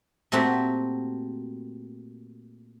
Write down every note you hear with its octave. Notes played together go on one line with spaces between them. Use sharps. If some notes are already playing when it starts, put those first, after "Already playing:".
A#2 A3 C4 F#4 G4